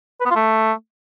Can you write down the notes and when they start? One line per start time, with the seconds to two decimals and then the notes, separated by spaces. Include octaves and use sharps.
0.20 B4
0.25 B3
0.30 F4
0.35 A3